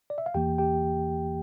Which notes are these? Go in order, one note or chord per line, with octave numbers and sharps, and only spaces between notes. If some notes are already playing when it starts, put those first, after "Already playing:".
D5
E5
F5
E2 E3 A#3 G4 G5
G4 G5